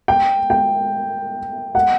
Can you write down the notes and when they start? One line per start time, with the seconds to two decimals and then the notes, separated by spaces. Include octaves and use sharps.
0.08 G5
0.50 G5
1.75 F#5